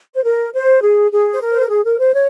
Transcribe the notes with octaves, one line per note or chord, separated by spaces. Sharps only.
C5
A#4
C5
G#4
G#4
C5
A#4
C5
A#4
G#4
A#4
C5
C#5